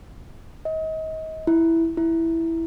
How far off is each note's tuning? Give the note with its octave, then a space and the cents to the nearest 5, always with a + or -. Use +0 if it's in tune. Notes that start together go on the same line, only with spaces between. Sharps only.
D#5 +30
E4 +0
E4 +0